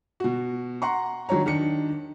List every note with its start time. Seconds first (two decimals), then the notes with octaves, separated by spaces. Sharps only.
0.20 B2 F#4
0.82 F#5 A#5 C6 C#6
1.29 D#3 F#3 D4 C#5 A#5
1.46 D#3 D4 C#7